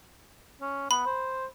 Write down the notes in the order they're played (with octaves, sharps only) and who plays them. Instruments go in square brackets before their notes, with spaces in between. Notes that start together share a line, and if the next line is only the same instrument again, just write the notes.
[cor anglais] C#4
[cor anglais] B3 [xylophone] B5
[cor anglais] C5